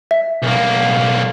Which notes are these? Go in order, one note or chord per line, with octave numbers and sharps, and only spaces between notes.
E5
B1 A#3